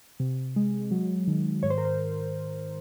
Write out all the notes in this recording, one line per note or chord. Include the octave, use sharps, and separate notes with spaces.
C3
G#3
F#3
D#3
G#2 C#5
C5
A#4
C5